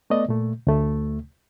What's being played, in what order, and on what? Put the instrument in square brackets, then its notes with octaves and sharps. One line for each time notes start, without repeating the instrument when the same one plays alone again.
[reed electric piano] A3 B3 D5 D#5
A#2 A3
D2 A3